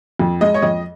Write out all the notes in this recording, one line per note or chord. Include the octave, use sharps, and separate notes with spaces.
F2
G#3 D#5
C#5
F2 D#5